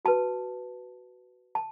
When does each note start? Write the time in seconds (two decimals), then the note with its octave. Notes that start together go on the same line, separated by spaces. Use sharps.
0.05 F#4 B4 A5
1.55 A5